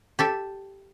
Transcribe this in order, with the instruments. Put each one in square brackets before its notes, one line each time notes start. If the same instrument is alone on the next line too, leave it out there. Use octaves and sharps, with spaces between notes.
[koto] G4 A4 E5